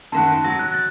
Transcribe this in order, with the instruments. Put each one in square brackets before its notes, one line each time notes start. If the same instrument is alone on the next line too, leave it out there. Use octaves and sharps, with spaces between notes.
[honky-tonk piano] F#2 D#3 F#5 [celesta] A5
[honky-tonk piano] F#3 [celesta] A#6
[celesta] F#6
A6